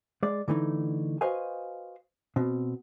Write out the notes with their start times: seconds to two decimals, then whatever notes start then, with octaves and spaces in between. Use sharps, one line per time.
0.23 G#3 D5
0.48 D3 E3 A3 D#4
1.21 F#4 B4 C5 D#5 F5 G#5
2.36 B2 C4